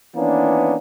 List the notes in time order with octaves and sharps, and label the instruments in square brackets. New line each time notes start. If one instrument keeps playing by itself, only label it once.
[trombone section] D#3 E3 A#3 B3 C#4 D4